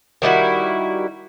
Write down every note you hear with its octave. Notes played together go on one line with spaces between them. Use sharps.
D#3 G3 E4 F#4